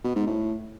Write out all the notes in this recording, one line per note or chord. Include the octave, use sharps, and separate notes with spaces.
B2
G#2
A2